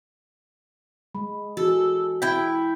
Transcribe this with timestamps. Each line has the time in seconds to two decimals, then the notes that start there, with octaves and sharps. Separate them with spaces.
1.15 G#3 B5
1.57 E3 F#4 G#4 A4
2.22 E4 G5